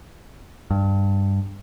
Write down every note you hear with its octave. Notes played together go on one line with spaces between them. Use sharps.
G2